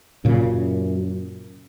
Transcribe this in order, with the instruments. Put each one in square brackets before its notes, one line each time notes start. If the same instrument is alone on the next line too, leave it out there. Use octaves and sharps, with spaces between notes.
[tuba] F#2 [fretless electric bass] A#2 C#3